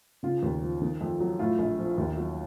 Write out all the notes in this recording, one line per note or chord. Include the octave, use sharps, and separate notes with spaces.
C#3 F4
D#2
F3
D#3
F2
F#3
A2 F4
A#1
F3
D#2
F#3